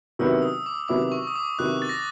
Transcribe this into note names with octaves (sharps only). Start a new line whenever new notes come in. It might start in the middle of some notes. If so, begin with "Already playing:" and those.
C3 D#3 F#3 B3 E4 E6
D#6
D6
C3 D#3 F#3 B3 E4 D6
C#6
D#6
D6
C3 D#3 F#3 B3 E4 F#6
A6
A#6